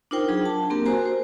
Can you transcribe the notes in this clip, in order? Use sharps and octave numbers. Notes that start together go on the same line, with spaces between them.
D4 D#4 F4 A#4 C5 G5
F#3 G#4
D4 A5
A#3 C4 G4 A#4
F#4 A#4 C5 G#5 A#5
C5